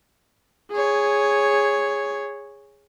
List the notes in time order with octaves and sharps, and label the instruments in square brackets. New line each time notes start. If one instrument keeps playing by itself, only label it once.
[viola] G#4 C#5